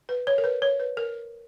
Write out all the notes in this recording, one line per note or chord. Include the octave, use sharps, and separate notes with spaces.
B4
C#5
A#4
B4
C#5
B4
A#4